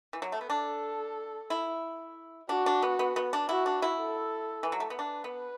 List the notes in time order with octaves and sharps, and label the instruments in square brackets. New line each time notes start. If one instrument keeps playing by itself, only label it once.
[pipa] E3
F#3
A3
B3
[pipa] D4 [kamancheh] A4
[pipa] E4
[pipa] D4 [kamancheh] F#4
[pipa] D4
B3
B3
B3
D4
[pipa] E4 [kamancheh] F#4
[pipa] D4
E4
[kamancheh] A4
[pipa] E3
F#3
A3
B3
[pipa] D4 [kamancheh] B4
[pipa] B3